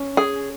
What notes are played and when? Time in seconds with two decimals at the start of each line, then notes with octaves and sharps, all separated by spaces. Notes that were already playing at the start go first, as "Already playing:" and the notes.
Already playing: C#4
0.17 G#4